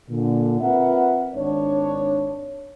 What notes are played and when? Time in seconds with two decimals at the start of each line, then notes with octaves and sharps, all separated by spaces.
0.10 A#2 D3
0.61 C4 F4 A#4 B4 E5 F#5
1.35 G#1 D4 C#5